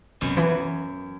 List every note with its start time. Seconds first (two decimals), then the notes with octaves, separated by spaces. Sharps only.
0.21 F#2 C3 F#3 B3
0.37 E3